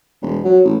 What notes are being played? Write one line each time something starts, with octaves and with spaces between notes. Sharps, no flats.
E1
F#3
A1